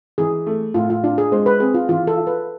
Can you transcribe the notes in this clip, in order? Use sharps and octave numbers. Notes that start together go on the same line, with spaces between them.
E3 G#4
A3
A2 F4
F4
D4 F4
G#4
G#3 C5
B4
C4 G#4
F4
E3 F4
A4
F4
B4